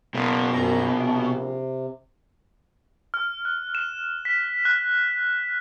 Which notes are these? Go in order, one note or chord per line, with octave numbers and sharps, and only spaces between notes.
F#1 B2
A#1 F#2 A#5
C3
F6
F#6
E7
B6
F#6